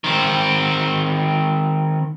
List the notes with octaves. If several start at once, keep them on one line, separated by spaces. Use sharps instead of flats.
D#3 C4